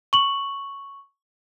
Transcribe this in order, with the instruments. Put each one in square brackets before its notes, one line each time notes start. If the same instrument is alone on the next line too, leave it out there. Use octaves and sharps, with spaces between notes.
[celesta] C#6 F#7